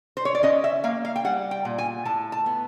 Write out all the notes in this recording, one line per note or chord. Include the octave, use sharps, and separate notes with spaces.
C5
C#5
D5
C#4 D#5
E5
A#3 F5
F5
G5
G3 F#5
G5
A#2
G#5
A2 A5
A5
B3